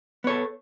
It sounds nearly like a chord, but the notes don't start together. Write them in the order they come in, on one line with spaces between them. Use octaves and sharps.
B3 C#5 A4